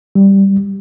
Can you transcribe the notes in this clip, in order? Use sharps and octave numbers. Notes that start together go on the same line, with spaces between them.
G3